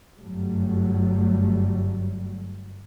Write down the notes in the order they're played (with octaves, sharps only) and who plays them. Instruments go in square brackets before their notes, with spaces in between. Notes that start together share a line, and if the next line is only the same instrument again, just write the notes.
[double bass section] G1 F#2 F#3 G3 A3